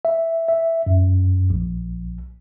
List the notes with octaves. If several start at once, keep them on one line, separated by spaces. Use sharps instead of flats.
E5
E5
F#2
A#1